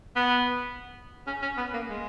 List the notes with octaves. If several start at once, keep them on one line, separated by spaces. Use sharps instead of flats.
B3
C#4
C#4
B3
A#3
G#3